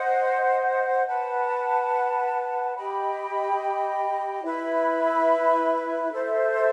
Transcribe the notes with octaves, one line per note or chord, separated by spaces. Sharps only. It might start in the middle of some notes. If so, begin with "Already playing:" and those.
Already playing: C5 D#5 F#5
B4 F#5 A5
G4 D#5 G5 B5
E4 B4 E5 B5
A4 C5 E5